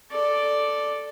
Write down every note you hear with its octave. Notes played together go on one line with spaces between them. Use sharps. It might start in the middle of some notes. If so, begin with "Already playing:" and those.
A4 D5